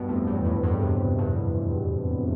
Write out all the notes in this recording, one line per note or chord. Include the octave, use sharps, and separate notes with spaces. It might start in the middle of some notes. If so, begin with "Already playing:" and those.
Already playing: G2 B2
F2 A2
E2 G2
F2 A2
G2 B2
A2 C3
G2 B2